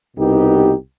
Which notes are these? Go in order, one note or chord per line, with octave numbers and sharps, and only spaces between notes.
C2 B2 B3 D#4 G4